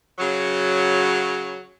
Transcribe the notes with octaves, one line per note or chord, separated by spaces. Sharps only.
C#3 F#3